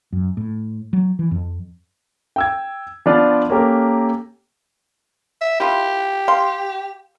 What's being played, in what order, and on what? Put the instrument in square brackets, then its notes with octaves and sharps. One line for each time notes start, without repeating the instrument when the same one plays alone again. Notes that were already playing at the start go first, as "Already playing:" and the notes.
[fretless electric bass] F#2
A2
F#3
E3
F2
[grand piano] G5 E6 G#6
F3 B3 D4 F4 D5
A#3 C#4 G4 A4 A#4
[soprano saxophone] E5
[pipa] E4 F4 [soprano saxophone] G4
[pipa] F5 C6